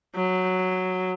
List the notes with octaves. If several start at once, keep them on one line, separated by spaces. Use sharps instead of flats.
F#3